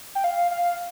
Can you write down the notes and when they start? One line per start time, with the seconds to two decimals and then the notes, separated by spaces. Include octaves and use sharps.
0.15 G5
0.24 F5
0.51 F5